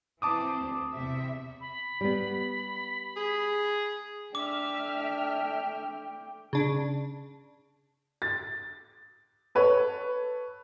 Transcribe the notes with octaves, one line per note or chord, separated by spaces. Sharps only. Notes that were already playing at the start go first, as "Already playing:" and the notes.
E3 C4 A5 D6 D#6
D2
E2 C3 E5
B5
G3 B3
G#4
A3 D4 E5 G5 D6 F6
C#3 D4
A6
A4 B4 C#5